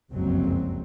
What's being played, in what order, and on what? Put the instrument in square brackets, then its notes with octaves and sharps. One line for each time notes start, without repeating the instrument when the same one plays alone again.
[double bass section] F#1 C2 F2 F#3 G#3 C4